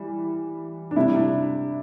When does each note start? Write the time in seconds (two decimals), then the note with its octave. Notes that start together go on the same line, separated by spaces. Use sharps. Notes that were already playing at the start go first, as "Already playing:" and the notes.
Already playing: E3 G3
0.91 D4
0.96 C3 G3 E4
1.16 D4